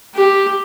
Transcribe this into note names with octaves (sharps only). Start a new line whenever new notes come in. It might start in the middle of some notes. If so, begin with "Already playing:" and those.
G4